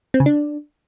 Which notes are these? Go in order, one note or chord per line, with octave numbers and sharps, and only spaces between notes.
C4
C#3
D4